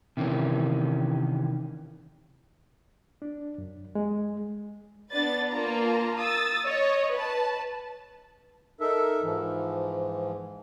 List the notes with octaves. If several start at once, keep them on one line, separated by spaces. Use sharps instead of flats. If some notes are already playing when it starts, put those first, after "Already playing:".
C3 D#3 E3 C#4
D4
F#2
G#3
B3 D4 B4 A6
A#3 F4 A#4 A5 A#5
D#6 E6 A6
C#5 D#5
B4 A5
D#4 A4 A#4 E5
G#2 E3 F3